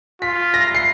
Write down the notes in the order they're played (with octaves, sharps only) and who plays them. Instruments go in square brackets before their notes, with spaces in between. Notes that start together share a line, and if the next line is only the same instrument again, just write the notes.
[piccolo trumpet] F4 [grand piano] B6
[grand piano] A#6
C7